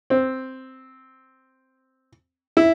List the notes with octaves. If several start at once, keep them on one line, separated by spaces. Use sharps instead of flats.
C4
E4